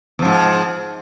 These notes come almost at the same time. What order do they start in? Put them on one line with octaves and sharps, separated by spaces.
E2 F3 G#2